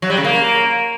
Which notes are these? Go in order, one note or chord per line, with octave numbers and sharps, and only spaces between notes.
F#3
G3
C#3
A#3